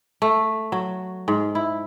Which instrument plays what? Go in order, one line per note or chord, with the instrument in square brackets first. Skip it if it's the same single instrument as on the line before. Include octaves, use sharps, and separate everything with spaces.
[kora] A3
F#3
G#2
E4